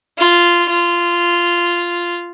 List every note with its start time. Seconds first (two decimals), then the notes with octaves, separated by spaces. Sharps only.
0.18 F4
0.69 F4